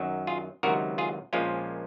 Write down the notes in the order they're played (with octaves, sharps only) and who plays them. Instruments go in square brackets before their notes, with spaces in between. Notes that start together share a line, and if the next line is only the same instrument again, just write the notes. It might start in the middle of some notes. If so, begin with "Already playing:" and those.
Already playing: [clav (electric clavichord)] F#2 D#3 F#3
F4 G#4
C#2 C3 D#3 F#3 F#4 A#4
F4 G#4
A#1 A#2 F3 G#3 C#4 F4